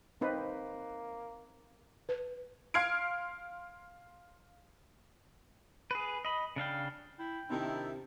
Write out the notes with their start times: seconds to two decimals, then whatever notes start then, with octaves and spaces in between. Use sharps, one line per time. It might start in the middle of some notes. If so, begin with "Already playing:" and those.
0.21 A#3 C4 D#4 B4
2.09 B4
2.74 F5 C6 F6 G#6 C7 D7
5.91 G#4 B4
6.25 D#5 B5
6.56 C#3 D4 F5 G5
7.19 E4 G5
7.50 C3 D#3 C4 D4 E4